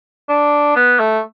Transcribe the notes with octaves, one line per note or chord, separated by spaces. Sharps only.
D4
B3
A3